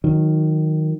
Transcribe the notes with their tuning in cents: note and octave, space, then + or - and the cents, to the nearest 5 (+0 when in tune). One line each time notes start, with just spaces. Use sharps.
D#3 +0 F#3 -25